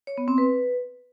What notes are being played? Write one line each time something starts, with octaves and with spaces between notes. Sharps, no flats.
C#5
B3
C4
B4